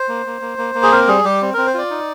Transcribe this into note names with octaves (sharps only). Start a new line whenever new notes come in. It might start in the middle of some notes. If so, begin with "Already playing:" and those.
Already playing: C5
A#3
A#3
A#3
A#3
A#3
G#4
C4 A#4
G3 G#4
G3 G4
C4
C4 A#4
C5
F4 D5
D#4